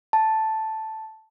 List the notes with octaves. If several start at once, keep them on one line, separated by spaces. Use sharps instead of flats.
A5